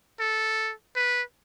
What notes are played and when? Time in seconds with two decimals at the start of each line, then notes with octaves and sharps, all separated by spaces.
0.20 A4
0.96 B4